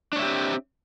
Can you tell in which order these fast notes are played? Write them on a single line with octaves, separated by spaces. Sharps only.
D4 C#5 E5 G4 C4